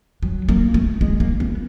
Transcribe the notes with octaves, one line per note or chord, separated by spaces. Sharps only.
F#3
A#3
A3
G#3
A#3
B3